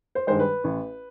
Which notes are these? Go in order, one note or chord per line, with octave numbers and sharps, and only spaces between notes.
C5
G2 D#3 G#3 C5
B4
A1